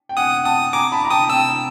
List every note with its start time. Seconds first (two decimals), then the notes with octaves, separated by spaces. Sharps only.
0.09 G5
0.17 F#5 G#5 D#6
0.45 G5 A5 D#6
0.73 G#5 A#5 D6
0.92 A5 B5
1.05 A#5
1.10 G5 A5 D#6
1.29 G5 A5 E6